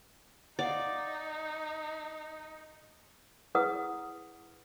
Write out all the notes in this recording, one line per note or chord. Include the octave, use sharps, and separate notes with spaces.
D#4 D5 F5 F#5
E4 G#4 B4 F#5 D#6